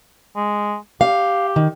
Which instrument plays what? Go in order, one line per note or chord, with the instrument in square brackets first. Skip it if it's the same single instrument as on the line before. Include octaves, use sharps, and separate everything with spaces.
[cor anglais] G#3
[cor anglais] G4 [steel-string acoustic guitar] F5
[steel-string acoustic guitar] D#3